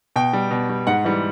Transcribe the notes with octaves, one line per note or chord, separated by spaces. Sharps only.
B2 G5
G3
B2
G3
G#2 F#5
E3 G3